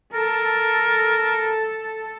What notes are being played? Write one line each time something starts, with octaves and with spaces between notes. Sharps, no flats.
A4 A#4